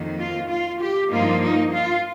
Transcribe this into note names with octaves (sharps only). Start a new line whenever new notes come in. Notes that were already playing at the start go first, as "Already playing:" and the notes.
Already playing: F2 D#3 A#3
F4
F4
G4
G2 F3 A#3 D#4 F4
D#4
F4